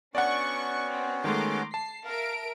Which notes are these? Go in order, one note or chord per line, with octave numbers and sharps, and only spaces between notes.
B3 C#4 D4 F#4 D5 F#5 C#6
C4
D#3 G#3 A3 A#5 C6 D6
A5 C7
A#4 E5 F5 D7